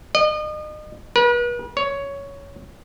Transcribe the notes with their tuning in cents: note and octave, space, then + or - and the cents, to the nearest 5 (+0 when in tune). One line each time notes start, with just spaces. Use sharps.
D#5 -35
B4 -40
C#5 +10